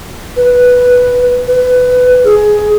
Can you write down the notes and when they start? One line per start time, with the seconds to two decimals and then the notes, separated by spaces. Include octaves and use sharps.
0.37 B4
1.47 B4
2.25 G#4